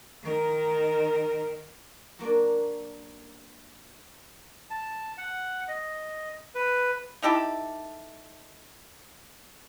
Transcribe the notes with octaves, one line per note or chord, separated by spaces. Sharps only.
D#3 A#4
F#3 A#3 D4 D5
A5
F#5
D#5
B4
D#4 E4 G4 A4